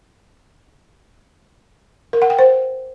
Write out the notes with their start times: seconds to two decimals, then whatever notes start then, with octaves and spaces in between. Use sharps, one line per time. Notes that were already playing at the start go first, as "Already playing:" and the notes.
2.13 A#4
2.22 F#5
2.30 G5
2.39 C5